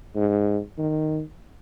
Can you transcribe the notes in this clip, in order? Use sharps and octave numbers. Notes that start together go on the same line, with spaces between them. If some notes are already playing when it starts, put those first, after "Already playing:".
G#2
D#3